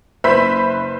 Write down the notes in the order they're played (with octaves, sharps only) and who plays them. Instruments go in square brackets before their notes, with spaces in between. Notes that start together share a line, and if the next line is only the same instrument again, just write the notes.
[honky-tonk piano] F#1 B4 C5 E5 B5 B6